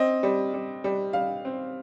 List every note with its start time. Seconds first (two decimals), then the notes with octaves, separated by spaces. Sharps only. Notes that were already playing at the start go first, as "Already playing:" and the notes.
Already playing: C4 D#5
0.23 G3
0.54 G3
0.84 G3
1.13 G3 F5
1.45 C4